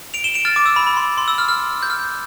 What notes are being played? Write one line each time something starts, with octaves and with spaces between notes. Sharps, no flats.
D7 F7
E7 G7
D7 F7
F6 A6
D6
E6
B5
B5
C6
C6
E6
F6
F6
G6
F6